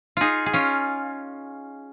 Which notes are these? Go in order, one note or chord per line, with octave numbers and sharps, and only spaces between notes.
D#4 F4 G#4
G#4
C#4 F4